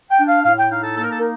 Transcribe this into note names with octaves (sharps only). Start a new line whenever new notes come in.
G5
D4
F5
A2 F5
G5
D#4 F5
A4
A#3 A4
A#4
A4
A#4
D#4